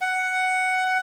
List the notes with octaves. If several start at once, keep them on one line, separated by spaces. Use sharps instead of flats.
F#5